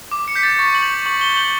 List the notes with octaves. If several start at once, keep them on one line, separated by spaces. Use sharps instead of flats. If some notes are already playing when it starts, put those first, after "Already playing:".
D6
C#7
G6 B6
A6
C#6 A6
F#7
G6
C#6 F#7
G7
G6
F#7